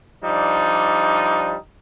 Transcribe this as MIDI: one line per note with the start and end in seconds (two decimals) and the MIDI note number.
0.23 1.55 53
0.23 1.55 55
0.23 1.55 62
0.23 1.55 63